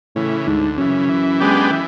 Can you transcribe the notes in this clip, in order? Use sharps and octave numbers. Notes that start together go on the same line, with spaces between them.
A2 C#3 E3
D2 G#2
F#2 C#3 E3
E3
G#3 B3 D4 G4
E3